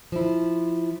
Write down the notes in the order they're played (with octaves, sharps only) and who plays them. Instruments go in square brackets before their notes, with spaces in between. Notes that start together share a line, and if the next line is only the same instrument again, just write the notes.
[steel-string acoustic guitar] F3 E4